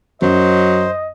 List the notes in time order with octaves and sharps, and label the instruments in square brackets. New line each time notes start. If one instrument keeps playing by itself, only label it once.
[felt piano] F#2 [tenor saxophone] F#3 [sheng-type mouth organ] C5 [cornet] D#5